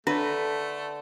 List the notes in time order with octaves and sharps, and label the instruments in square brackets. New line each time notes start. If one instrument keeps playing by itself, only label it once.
[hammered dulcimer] D3 [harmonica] A3 [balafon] D4 C#5 [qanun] B4